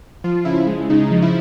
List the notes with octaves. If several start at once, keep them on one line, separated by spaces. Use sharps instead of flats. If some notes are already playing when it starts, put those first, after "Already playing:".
F3 F4
C#3 E4
G#3
C#3 D#4
F3
E4